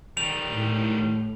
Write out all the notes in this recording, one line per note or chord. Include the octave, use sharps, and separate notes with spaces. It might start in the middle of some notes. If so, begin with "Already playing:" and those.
D#3 G3 F7
A2